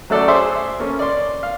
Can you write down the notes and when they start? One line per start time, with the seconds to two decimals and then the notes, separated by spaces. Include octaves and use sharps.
0.10 F#3 A3 C#4 A4 D5
0.28 G#4 C5 E5 C6 D6
0.80 A#3 C#4 A4
0.99 D5 C6
1.43 F5